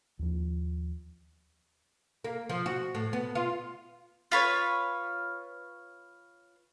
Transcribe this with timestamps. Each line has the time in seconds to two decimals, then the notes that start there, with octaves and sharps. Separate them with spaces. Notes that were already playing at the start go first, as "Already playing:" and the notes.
0.19 D#2 F3
2.24 A#3
2.49 F3
2.66 F#4
2.95 A2
3.13 B3
3.35 F4
4.32 F4 B4 C#5